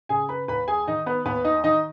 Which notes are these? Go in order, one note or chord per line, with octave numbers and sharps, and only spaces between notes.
C#3 G#4 G#5
B4 B5
D#2 B4 B5
G#4 G#5
D#3 D#4 D#5
B3 B4
D#2 B3 B4
D#4 D#5
D#3 D#4 D#5